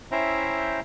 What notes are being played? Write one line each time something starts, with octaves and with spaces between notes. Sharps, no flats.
C#4 E4 C5 E5 G5 A#5